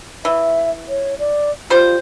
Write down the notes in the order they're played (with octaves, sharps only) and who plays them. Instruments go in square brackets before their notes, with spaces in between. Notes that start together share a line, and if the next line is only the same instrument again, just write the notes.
[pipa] E3 [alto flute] E5
[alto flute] C#5
D5
[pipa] G3 C5 [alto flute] F4